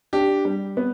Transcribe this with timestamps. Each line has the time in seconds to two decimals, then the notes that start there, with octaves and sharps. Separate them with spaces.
0.13 D4 G4
0.45 G3
0.77 B3